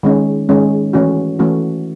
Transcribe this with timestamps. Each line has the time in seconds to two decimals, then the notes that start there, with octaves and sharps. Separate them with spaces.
0.03 D#3 G#3 C#4
0.49 D#3 G#3 C#4
0.93 E3 A3 C#4 F#4
1.39 E3 A3 C#4 F#4